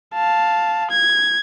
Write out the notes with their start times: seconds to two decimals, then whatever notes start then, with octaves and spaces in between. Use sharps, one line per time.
0.14 F5 A5
0.91 G#6